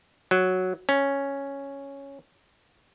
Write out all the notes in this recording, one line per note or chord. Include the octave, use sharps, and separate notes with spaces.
F#3
C#4